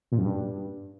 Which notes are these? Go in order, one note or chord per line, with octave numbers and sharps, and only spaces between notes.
A#2
F#2
G2